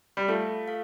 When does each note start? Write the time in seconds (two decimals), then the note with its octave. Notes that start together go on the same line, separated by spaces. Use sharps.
0.17 G3
0.28 A3 F4 A4 F5
0.68 A4 F5